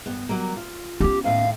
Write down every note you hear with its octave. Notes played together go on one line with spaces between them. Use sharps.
G2 B3
F#3 G3 A#3
F4
B3 C#4 G4
D#2 A2 F5